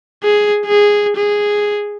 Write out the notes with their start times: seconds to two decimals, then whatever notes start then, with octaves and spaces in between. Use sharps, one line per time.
0.23 G#4
0.66 G#4
1.17 G#4